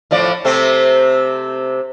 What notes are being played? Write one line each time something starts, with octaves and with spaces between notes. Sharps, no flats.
A2 F3 D5
C3 A3 C4